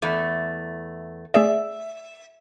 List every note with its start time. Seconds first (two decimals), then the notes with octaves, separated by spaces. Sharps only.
0.02 E2 A3
1.34 A3 G#4 D5 E5